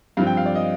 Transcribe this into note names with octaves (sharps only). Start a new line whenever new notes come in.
G2 F3 C4 F5
G5
F5
D5
D#5